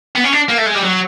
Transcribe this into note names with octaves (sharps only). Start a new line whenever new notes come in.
B3
C#4
D4
A#3
A3
G#3
G3
F#3